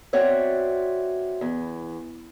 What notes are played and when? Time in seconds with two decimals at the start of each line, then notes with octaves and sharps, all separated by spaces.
0.13 C4 F#4 C#5 D5 E5
1.41 E2